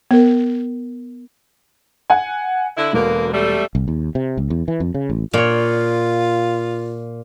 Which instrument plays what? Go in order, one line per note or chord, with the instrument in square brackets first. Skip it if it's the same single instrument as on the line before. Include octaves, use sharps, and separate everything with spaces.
[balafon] B3 A#4
[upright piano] F#5 G#5
[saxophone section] D3 E4
[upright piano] E1 [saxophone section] B2 D3 A#3
[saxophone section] G3 A3
[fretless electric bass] C2
D#2
C3
C#2
E2
E3
F2
C#3
A1
[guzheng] A#2 C#5 [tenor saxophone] F4